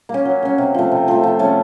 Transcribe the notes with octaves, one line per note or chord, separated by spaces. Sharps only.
A#3 C#4
F#3
A#3 C#4
C3
F3 A3
C3
F3 A3
F3
A3 C#4